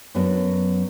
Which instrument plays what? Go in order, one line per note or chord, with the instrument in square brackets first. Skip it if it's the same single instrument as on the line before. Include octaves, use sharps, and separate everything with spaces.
[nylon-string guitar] F#2 F#3 B3 D4